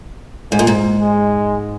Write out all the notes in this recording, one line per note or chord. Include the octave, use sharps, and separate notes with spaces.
G#2 G#3
A#2
G#2
G#3